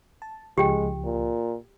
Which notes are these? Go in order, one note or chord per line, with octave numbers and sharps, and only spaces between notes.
A5
C#2 C#3 F3 G#3 G4 G5
A#2